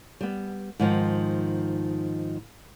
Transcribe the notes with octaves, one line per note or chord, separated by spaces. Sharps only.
G3 B3
G#2 D#3 F3